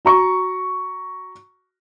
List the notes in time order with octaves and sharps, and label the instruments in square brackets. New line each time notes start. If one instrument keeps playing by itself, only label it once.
[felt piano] F#4 A#5 C#6